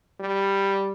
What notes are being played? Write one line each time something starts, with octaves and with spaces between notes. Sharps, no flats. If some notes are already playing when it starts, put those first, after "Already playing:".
G3